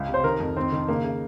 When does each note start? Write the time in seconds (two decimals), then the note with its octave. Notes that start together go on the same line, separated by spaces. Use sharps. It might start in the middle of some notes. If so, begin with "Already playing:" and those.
Already playing: C#2
0.08 C3
0.14 C5
0.24 D#3 A#4
0.40 F2
0.56 D#3 C4
0.73 D#3
0.88 C#3 A#3
1.04 C#3